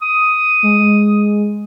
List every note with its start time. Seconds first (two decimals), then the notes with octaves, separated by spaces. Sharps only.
0.02 D#6
0.63 G#3
0.79 G#3